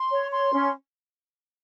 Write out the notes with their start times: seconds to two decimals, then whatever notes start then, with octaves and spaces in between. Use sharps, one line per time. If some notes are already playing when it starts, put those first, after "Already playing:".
Already playing: C6
0.11 C#5
0.31 C6
0.53 C#4